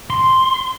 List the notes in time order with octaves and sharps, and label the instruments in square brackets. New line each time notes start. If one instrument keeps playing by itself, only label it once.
[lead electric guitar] C6